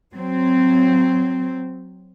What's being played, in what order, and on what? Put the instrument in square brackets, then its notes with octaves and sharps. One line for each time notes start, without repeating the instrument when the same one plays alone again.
[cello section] F#3 C4